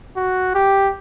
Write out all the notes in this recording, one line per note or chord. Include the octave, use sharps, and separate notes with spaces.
F#4
G4